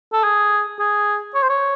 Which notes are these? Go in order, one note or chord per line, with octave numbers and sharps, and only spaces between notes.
A4
G#4
G#4
C#5
C5
C#5